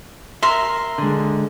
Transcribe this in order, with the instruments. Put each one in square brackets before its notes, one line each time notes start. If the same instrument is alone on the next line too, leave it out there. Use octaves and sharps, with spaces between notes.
[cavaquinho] A#4 C6 [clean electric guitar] E5
[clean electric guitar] D3 G#3